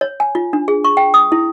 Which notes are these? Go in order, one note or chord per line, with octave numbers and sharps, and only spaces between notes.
C#5
G#5
F4
D4
G#4
C#6
G5
D#6
E4